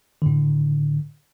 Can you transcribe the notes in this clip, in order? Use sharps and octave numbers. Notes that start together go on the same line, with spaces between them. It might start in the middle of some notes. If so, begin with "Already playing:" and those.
A2 D3